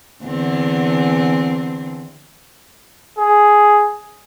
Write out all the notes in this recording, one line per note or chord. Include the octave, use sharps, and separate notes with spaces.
E2 D3 C4
G#4